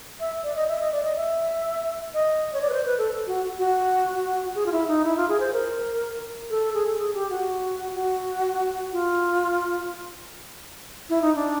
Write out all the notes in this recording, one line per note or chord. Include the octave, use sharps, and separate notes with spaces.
E5
D5
D#5
E5
D#5
D5
D#5
E5
D#5
C#5
D5
B4
C5
B4
A4
F#4
F#4
G#4
F4
E4
D#4
E4
F4
G#4
C5
A#4
A4
G#4
A4
G#4
G4
F#4
F#4
F4
E4
D#4
D4